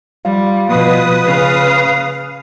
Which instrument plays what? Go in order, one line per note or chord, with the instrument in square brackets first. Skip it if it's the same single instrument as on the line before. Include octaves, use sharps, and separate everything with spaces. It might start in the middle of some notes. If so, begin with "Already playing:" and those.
[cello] G3 [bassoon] F4
[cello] B2 F3 [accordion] B4 D#6
[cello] C#3 F5